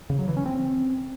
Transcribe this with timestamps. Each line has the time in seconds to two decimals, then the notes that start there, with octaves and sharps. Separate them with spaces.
0.10 C#3
0.19 F#3
0.28 E3
0.37 C#4
0.46 C4